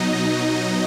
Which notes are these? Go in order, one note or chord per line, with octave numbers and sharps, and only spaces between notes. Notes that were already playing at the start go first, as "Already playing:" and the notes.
Already playing: B2 F#3 D#4 D#5